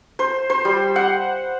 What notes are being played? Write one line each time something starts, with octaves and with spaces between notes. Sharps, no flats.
C5
C5
G3
F#5